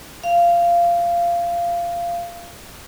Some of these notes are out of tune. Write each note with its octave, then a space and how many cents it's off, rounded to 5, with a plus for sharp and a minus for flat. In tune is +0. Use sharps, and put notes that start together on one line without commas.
F5 -15